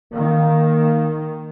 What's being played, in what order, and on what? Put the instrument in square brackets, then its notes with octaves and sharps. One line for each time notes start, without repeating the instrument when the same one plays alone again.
[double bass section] D#3 [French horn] A#3